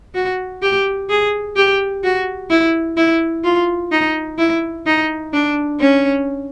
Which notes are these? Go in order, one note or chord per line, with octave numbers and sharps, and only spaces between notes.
F#4
G4
G#4
G4
F#4
E4
E4
F4
D#4
E4
D#4
D4
C#4